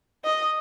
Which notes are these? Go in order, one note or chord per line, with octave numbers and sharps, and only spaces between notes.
D#5